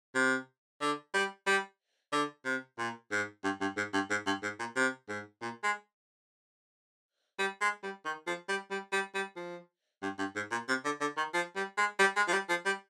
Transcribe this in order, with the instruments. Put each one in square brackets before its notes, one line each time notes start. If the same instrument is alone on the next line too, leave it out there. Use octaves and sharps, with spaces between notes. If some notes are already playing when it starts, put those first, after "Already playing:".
[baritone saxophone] C3
D3
G3
G3
D3
C3
A#2
G#2
G2
G2
G#2
G2
G#2
G2
G#2
A#2
C3
G#2
A#2
G#3
G3
G#3
G3
D#3
F3
G3
G3
G3
G3
F3
G2
G2
G#2
A#2
C3
D3
D3
D#3
F3
G3
G#3
G3
G#3
F3
G3
F3
G3